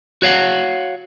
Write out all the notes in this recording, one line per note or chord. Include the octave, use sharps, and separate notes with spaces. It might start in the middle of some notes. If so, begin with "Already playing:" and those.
F#4 C#5 F5 F#5